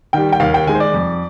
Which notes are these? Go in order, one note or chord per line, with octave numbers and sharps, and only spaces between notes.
D#3 G3 G5
G5
D#2 F5
G5
D#3 G#3 G#5
C5
D5
F2